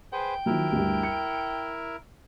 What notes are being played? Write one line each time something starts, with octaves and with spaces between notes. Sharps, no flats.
G#4 B4 C5 G5
D#3 F3 F#3 E4 A#4
D2 G2
C#7